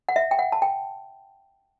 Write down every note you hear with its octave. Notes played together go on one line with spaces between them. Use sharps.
F#5
E5
G5
F#5
A5
G5